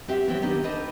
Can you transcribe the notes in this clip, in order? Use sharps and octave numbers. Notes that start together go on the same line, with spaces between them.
C4 F#4 G4 E5
E3 F#3 B3 C4
D#3 B3 D4 D#4 G4
D4 D#4 A4 B4 C5 D#5